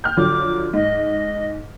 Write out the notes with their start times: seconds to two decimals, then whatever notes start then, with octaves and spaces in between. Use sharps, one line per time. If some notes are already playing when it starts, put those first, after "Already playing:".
0.04 G5 F6 G6
0.17 D3 F3 F#3 D6
0.74 G#2 D#5